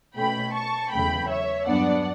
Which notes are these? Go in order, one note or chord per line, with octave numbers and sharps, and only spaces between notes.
B2 A3 C#4 G5 B5
A5 C#6
E2 C#3 F#3 A3 G5 B5
C#5 E5
G2 F#3 B3 D4 D5 F#5